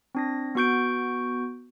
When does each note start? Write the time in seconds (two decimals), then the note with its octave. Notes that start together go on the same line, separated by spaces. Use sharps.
0.15 C4 D4 A#6
0.55 B3 F#4 C#6 G6 D7